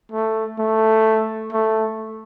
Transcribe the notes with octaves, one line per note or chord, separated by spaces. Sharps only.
A3
A3
A3